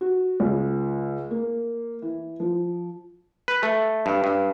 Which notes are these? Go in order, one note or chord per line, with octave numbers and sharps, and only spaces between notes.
F#4
C#2
A#3
E3
F3
B4
A3
G2
G2